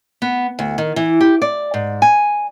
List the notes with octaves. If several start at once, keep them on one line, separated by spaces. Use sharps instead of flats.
B3
D2
D#3
E3
G4
D5
G#2
G#5